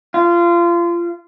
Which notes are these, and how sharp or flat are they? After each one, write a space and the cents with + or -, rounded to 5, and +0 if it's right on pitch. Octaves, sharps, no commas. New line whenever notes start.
F4 -25